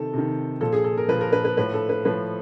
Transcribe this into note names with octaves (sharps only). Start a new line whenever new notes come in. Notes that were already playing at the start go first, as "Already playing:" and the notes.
Already playing: C3 D#3 A4
C3 D#3
A#2 F3 A4
G#4
A4
A#4
A#2 F3 B4
A#4
B4
B4
A2 F3 B4
A4
B4
A2 F3 B4